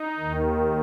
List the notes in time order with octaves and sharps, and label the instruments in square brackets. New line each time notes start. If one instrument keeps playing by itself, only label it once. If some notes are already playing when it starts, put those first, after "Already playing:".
Already playing: [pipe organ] D#4
D#2 D#3